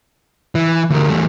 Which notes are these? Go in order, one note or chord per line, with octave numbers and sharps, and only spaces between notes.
E3
D2 A#4
E2 A3